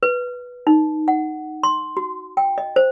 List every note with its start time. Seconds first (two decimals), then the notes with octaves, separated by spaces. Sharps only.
0.03 B4
0.67 D#4
1.08 F#5
1.63 C6
1.97 F#4
2.37 G5
2.58 D#5
2.76 C5